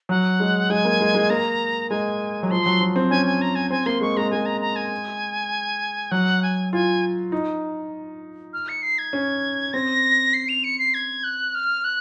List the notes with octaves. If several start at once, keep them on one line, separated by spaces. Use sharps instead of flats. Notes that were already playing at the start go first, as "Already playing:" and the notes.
F#3 F#5
G#3
G#3 G#5
A#3
G#3
G#3
A#3 A#5
G#3 G#5
F#3
F3 C6
F#3
F3
C4
C#4 G#5
G#5
A#5
G#5
C4 G#5
A#3 C6
G#3 C#6
G#3 A#5
G#3 G#5
A#5
A#5
G#5
F#3 F#5
G#5
F4 G#5
D#4
F6
C#7
C7
G#6
C#4
C4 A#6
C7
F7
C#7
C7
G#6
F#6
F6
F#6